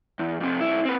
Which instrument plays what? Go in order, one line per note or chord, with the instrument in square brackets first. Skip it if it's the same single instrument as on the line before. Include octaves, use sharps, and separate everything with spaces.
[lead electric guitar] E2
F2 C3
B1 E4
C4 B4